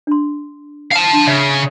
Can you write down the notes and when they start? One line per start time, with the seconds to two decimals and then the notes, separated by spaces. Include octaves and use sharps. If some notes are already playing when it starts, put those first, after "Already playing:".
0.07 D4 C6
0.92 F5 A5
1.13 D4
1.27 C#3 E5